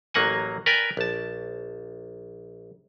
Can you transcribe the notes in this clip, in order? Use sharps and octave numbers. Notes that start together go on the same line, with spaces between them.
A1 F#3 A#3 F#5 G#5
A#4 B4 D5 G5 G#5
A#1 A5